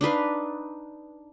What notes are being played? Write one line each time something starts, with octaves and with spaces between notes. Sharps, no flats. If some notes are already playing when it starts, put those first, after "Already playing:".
D4 D#4 B4 F5